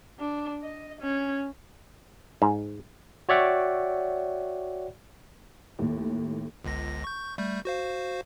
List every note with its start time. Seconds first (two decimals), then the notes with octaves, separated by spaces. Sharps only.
0.20 D4
0.63 D#5
1.01 C#4
2.42 G#2
3.29 F#4 C#5 D5 E5 F#5 G5
5.79 D#2 A2
6.64 G1 C#2 A#6
7.04 C#6 G6
7.38 G3 A3 G6
7.65 F#4 C5 F5